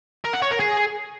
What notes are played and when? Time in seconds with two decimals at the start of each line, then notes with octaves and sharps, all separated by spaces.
0.25 A#4
0.34 F#5
0.42 C#5
0.51 A#4
0.60 G#4